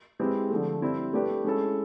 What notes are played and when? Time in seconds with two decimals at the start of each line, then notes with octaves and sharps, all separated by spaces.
0.19 G#3 C4 E4 G4 B4
0.51 D3 F3 A3
0.82 G3 C4 E4
1.13 A3 D4 G4 B4
1.44 G#3 C#4 E4 A4